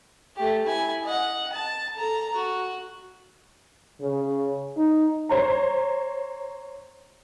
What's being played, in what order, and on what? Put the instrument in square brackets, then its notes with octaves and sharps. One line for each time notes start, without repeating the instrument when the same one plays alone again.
[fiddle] A3 G4
E4 G#5
D#5 F#5
A5
A4 A#5
F#4
[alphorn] C#3
D#4
[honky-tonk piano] C5 C#5 A#5